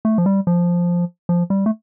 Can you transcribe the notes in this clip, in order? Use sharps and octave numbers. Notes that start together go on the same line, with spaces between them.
A3
F3
G3
F3
F3
G3
A3